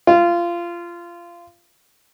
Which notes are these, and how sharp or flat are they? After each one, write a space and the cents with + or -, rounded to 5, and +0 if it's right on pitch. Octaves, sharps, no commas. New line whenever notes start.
F4 -20